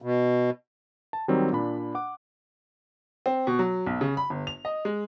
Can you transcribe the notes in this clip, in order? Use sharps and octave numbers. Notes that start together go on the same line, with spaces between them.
B2
A5
D#3 F#3 G3 C4 D#4
A#2 D4 B5
F#5 D6
C4
B2
F#3
B1
C#3
B5
G1
F7
D#5
G#3